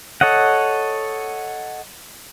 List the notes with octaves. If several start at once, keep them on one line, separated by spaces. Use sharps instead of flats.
A4 C#5 D#5 F#5